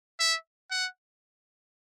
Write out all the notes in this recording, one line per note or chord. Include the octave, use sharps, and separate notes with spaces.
E5
F#5